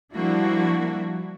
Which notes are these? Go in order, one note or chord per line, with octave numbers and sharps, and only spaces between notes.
F3 G3 A#3 D4 E4 F#4